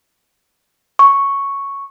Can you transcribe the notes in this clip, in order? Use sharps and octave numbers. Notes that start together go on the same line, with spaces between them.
C#6